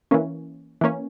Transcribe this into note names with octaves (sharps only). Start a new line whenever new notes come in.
E3 A#3 C#4
E3 A#3 C#4